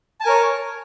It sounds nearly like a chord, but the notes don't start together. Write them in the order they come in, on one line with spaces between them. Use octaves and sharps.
A5 G#5 A#4 C#5